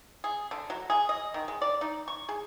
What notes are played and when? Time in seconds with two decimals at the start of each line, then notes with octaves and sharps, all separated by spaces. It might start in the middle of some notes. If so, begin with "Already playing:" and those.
0.24 G#4
0.51 D3
0.70 F#3
0.90 G#4
1.09 D#5
1.34 D#3
1.48 G#3
1.62 D5
1.81 D#4
2.08 C#6
2.29 G#4